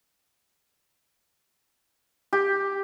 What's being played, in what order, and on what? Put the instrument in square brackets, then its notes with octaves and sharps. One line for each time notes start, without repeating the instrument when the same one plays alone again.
[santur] G4